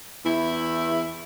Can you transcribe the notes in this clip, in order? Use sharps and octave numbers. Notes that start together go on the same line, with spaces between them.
E2 E4